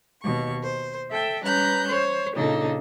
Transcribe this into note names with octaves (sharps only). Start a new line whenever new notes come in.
D#2 B2 C#6
C5
A4 E5 G5
G3 C#4 B4 A#5 F#6 G6
C5 C#5
A#2 C#3 D4 D#4 A4